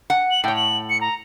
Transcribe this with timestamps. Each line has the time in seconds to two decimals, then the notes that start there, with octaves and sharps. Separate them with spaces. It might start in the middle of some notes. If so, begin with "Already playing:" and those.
0.10 F#5
0.31 F#7
0.44 A2 C#5 G5
0.56 F#7
0.90 C#7
1.01 A#5